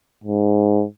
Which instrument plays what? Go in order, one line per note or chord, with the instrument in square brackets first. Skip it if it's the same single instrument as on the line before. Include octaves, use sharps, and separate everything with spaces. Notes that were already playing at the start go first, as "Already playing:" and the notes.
[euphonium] G#2